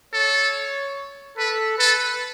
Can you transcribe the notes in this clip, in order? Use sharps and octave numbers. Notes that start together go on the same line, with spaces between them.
A4 C#5
A4 B4
A4 B4